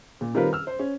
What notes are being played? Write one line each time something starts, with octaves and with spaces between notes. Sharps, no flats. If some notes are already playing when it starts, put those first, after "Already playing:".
A#2
D#3 G3 C4 F4 A#4 B4
E6 F6
C5
C#4